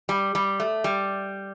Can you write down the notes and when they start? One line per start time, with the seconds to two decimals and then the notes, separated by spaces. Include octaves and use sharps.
0.09 G3
0.35 G3
0.60 A3
0.84 G3